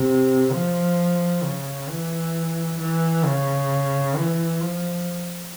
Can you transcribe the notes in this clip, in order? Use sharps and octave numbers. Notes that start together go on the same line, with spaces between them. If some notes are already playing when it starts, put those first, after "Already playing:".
Already playing: C3
F3
C#3
E3
E3
C#3
E3
F3